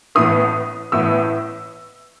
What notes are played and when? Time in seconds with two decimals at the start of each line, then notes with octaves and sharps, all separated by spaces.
0.15 A1 A2 E3 B3 D#6
0.92 A1 A2 E3 B3 E6